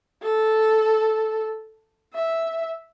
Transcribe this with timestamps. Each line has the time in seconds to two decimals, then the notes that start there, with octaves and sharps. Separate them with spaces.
0.22 A4
2.14 E5